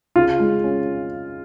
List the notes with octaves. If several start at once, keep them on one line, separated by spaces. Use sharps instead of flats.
C#3 F4
G#3
C#4